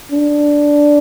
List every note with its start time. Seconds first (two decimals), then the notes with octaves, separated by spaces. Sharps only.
0.12 D4